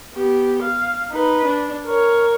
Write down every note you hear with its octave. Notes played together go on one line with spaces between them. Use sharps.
B3 G4
F5
D#4 B4
D4
A#4 C#5